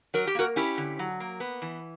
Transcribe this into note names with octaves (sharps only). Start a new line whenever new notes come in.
F#3 A#4
G4
A#3 F#4 A#4
C#4 E4 G4
D3
F#3
A#3
B3
E3